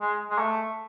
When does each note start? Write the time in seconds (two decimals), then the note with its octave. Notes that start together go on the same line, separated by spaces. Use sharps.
0.01 G#3
0.30 G#3
0.38 A3